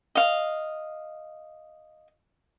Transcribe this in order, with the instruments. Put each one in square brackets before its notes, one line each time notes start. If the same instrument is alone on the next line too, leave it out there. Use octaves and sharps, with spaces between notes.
[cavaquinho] D#5 F5